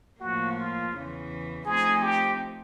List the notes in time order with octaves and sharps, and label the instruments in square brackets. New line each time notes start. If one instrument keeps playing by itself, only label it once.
[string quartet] A2 F3 A#3 [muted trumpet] F#4
[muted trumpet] F4
[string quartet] E2 C#3 E3
[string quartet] F3 A3 C4 D#4 [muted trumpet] G#4
[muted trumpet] G4